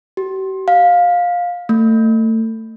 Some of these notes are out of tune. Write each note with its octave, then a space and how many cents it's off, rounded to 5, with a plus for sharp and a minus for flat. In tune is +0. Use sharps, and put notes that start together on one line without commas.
G4 -45
F5 +15
A3 +30